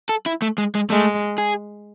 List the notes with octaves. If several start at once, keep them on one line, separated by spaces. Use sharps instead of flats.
A4
E4
A3
G#3
G#3
G#3 A3
G#4